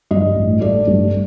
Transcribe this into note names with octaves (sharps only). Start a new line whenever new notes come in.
G2 D#5
A1
A3 D5
G2